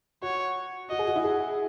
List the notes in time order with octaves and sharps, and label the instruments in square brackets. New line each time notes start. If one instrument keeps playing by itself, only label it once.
[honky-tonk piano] F#4 [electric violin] C#5
[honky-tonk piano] F#4 [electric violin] D#5
[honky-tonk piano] G#4
F#4
E4
G#4